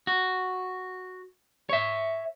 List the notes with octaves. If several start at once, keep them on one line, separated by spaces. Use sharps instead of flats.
F#4
C#5 E5